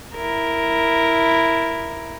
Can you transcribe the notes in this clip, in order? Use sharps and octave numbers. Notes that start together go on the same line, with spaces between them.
E4 A#4